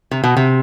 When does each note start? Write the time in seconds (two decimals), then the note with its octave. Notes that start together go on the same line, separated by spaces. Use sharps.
0.11 C3
0.24 B2
0.37 C3